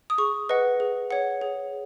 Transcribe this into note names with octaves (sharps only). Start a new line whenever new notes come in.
D#6
G#4 C#6
B4 D#5 F#5
G#4
C#5 F#5
G#4